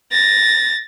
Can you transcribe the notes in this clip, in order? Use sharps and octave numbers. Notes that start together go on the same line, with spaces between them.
A6 A#6